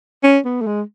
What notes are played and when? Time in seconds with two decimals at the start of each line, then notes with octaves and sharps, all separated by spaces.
0.23 C#4
0.45 B3
0.61 A3
0.67 G#3